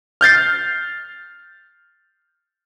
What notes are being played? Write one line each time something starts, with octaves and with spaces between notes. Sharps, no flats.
F6 G6 A6 C7